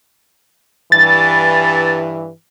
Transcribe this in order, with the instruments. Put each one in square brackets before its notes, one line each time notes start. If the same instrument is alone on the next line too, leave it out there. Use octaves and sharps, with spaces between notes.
[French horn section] G2 E3 [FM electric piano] A6